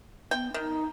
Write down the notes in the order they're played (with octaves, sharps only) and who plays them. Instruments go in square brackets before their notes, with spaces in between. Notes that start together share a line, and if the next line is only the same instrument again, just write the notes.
[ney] B3 [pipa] G5
[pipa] D#3 [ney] D#4